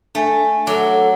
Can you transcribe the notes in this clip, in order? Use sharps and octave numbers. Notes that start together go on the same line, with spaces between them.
A3 D4 E5 G#5
F#3 A4 D6